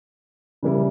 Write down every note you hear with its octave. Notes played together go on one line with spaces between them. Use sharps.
C#3 G3 A#3 E4